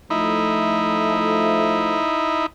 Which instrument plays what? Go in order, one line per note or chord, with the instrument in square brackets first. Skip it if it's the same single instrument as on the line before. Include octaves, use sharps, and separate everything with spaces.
[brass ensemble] F3 A3 [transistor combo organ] D#4 E4